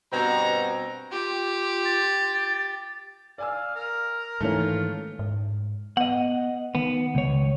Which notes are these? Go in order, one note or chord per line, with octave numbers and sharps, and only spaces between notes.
G2 B2 C4 F#4 A#5
F4 G4
A6
D5 F5 G#5 E6
A#4
G#2 D#3 E3 A3 A#3 C#4
F4
G#2
B3 D#5 F#5
D#3 B3
C#2 C#5